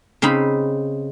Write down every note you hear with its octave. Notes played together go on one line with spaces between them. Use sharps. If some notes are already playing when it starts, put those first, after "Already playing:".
C#3 C4 D#4 B5